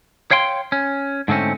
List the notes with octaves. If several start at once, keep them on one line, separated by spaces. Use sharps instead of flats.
C#5 F5 G5 C6
C#4
G#2 D3 A3 C4 C#4